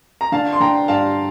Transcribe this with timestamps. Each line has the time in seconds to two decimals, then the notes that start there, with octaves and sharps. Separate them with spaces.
0.21 A#5
0.32 D3 F5 A5
0.53 C6
0.60 D3 G5 A#5
0.88 G2 F5 A5